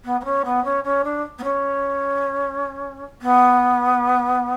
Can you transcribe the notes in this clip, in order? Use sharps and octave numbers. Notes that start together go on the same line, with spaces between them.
B3
B3
C#4
B3
C#4
C#4
D4
B3
C#4
B3